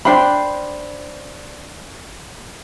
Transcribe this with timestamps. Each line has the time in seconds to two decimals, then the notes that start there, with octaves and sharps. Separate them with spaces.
0.05 D4 C5 G5 B5